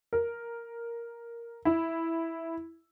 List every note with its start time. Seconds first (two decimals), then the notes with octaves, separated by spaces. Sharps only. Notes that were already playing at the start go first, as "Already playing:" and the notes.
0.13 A#4
1.65 E4